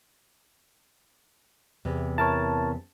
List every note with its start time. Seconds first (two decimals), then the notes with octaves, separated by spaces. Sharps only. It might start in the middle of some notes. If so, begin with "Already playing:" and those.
1.85 E2 C3
2.18 E4 A#4 C#5 A5